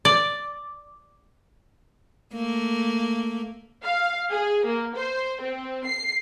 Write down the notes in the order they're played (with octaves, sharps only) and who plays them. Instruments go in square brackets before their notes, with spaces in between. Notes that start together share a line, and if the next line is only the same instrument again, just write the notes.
[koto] D5
[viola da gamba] A3 A#3
[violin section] F5
G#4
A#3
C5
C4
C7